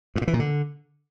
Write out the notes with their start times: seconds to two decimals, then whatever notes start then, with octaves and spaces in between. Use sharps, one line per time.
0.16 G2
0.22 A#2
0.28 E3
0.34 A#2
0.40 D3